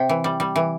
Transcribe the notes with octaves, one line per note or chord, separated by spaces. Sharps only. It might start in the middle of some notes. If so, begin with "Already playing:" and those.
Already playing: C3 G5
E3
G3
G3
E3